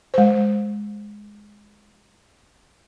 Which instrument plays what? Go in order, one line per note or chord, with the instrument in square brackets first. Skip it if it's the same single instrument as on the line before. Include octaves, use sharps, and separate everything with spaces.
[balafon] G#3 C5